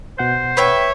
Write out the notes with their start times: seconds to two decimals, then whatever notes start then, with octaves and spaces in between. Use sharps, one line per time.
0.18 B2 C5 F#5 G6
0.57 B4 C#5 E5 G5